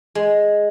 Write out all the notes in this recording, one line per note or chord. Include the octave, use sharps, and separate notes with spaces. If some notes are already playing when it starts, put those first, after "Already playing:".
G#3